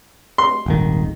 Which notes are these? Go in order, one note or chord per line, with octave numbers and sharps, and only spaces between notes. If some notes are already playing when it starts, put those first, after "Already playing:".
C6
D#1 G#1 D#3